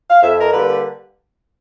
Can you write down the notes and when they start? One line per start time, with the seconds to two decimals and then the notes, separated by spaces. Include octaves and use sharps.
0.10 F5
0.23 F2 E5
0.41 A#4
0.52 D3 G3 A#3 B4